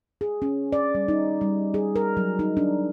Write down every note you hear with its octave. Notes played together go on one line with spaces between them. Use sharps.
G#4
C#4
D5
G3
D#4
G3
G#4
A#4
F#3
D#4
D4